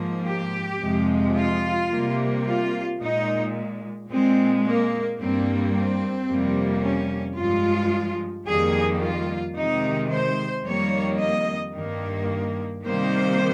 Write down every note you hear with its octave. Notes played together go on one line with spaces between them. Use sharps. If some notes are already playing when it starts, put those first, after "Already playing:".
Already playing: G#2 F3 A#3
G4
F2 C3 F3 G#3
F4
C3 G3 A#3
F4
A#2 G#3 D#4
A#2 G#3 C4
A#3
G2 G3 A#3 C4
C4
F2 C3 G3 A#3
C#4
G2 F3 G#3 F4
F2 D#3 G3 A#3 G#4
F4
C3 D#3 G#3 D#4
C5
F2 D#3 G3 A#3 C#5
D#5
G2 D#3 A#3
C3 D#3 G3 A#3 C5